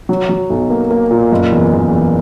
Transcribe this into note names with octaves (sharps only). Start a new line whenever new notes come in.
F#3
F#3
B1
A#3
A#3
A#2
F#1
E2
F#1
E2